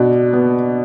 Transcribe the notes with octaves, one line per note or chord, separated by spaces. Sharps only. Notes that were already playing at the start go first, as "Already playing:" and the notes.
Already playing: B2 D4
B3